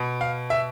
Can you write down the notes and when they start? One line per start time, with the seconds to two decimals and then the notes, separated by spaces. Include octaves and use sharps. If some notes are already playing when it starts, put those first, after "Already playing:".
Already playing: B2
0.21 F5
0.50 E5